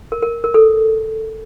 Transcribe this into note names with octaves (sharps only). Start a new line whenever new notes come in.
A#4
A#4
A#4
A4